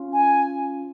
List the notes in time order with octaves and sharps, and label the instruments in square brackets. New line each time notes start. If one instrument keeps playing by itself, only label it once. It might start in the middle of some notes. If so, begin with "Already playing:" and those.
Already playing: [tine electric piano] C#4 F4
[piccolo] G#5